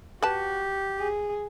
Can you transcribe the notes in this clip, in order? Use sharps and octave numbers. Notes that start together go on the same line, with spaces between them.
F#4 G4 B4 A5
G#4